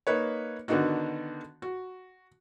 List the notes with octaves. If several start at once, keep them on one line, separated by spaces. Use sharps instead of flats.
A#3 D#4 B4 C#5
D3 D#3 B3 D4 D#4 F#4
F#4